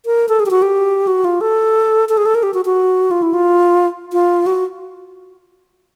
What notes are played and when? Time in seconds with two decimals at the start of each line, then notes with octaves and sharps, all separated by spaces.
0.06 A#4
0.29 A4
0.40 G#4
0.46 G4
0.51 F#4
0.62 G4
1.07 F#4
1.25 F4
1.41 A4
2.09 A4
2.17 G#4
2.26 A4
2.35 A#4
2.43 G4
2.54 F#4
2.65 F#4
3.11 F4
3.22 E4
3.34 F4
4.12 F4
4.46 F#4